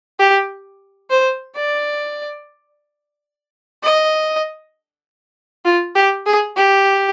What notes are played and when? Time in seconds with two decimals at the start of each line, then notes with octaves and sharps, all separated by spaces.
0.19 G4
1.10 C5
1.55 D5
3.83 D#5
5.65 F4
5.95 G4
6.26 G#4
6.56 G4